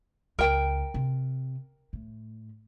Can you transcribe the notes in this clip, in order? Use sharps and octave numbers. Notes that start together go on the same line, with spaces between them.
C#2 A#4 G5
C3
A2